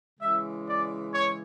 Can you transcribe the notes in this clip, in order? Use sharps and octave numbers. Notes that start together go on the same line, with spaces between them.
C#3 E3 G#3 E5
D5
C#5